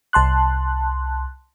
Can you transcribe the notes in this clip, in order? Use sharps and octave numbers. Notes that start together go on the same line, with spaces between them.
C2 A5 C6 F#6